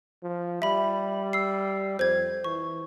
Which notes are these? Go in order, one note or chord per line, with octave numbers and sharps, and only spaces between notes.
F3
G3 E5 B5
E6 C7
F2 C5 G#6
E3 C#6